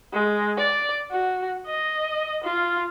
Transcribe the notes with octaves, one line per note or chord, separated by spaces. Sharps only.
G#3
D5
F#4
D#5
F4